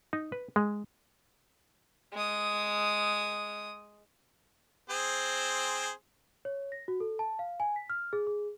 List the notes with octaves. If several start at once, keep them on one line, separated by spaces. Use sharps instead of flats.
D#4
B4
G#3
G#3 D#6
C4 G#4 C5
C#5
A#6
F#4
A4
A5
F5
G#5
B6
F6
G#4
G#4